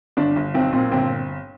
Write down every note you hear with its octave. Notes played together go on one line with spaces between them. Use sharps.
G1 D4
G1
B1 C4
A#2 C4
G1 C4